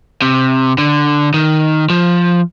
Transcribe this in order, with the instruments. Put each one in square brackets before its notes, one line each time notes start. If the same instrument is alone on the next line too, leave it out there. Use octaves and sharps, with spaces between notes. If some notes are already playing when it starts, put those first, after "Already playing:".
[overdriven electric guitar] C3
D3
D#3
F3